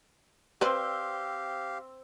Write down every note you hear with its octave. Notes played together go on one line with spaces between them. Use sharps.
C4 G4 B4 C5 D5 F5 G5